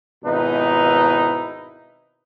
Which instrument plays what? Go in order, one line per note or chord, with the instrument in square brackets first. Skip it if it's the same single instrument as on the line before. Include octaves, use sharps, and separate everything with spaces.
[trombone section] G#1 B2 D#4 E4 B4